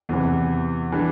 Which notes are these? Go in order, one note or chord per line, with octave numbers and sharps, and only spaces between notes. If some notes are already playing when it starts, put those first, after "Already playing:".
E2 C3 E3
E3 G3 D4